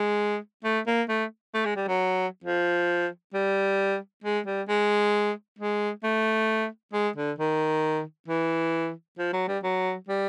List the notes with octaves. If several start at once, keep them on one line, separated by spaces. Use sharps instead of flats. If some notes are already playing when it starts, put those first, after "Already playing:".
Already playing: G#3
A3
A#3
A3
A3
G#3
G3
F#3
F3
G3
G#3
G3
G#3
G#3
A3
G#3
D3
D#3
E3
F3
F#3
G3
F#3
G3